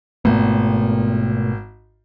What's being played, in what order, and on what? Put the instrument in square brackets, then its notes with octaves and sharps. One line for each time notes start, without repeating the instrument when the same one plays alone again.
[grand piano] G#1 [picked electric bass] B2 A3 B3